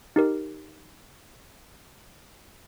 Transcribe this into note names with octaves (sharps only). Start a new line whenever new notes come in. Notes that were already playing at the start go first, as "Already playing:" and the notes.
D#4 G4 A#4